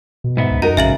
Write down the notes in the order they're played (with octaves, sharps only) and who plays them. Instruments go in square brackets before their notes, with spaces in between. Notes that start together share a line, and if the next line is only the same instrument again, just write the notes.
[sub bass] B2
[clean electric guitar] G#2 B3 E5
[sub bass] C#2
[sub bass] F#2 [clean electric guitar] D#4 [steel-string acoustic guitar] F#4 A#4 [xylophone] A#5
[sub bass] A#1 [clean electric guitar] G#2 C#3 [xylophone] E5 A6 F#7